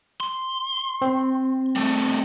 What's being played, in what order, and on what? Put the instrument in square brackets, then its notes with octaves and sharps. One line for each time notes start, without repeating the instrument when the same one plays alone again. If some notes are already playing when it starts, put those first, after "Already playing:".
[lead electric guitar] C6
[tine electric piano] C4
[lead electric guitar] G3 A3